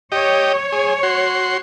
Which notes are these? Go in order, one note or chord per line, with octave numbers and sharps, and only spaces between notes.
G4 C#5 D#5
G#4
F#4 C6